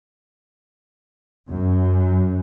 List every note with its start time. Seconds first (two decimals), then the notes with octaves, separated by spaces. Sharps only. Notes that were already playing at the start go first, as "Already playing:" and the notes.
1.49 F#2